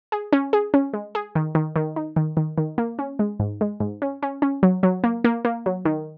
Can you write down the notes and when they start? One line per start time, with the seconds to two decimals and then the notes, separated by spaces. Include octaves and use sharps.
0.12 G#4
0.32 C#4
0.53 G#4
0.74 C#4
0.93 G#3
1.15 G#4
1.35 D#3
1.55 D#3
1.76 D#3
1.96 D#4
2.16 D#3
2.37 D#3
2.58 D#3
2.78 A#3
2.99 C#4
3.19 G#3
3.40 G#2
3.61 G#3
3.80 G#2
4.02 C#4
4.22 C#4
4.42 C#4
4.63 F#3
4.83 F#3
5.04 A#3
5.24 A#3
5.45 A#3
5.66 F#3
5.85 D#3